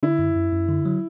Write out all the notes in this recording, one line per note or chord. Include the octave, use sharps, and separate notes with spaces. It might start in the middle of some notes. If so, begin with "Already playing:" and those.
D3 E4
F#2
F#2
F#2
D3
F#3